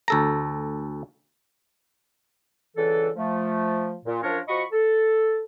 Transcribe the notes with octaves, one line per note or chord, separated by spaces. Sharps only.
D2 A4 A#5
C#2 D3 E3 A4
F3 A3
A#2
F#2 F3 D4 A#4 C#5
F3 F#4 D#5 B5 C#6
A4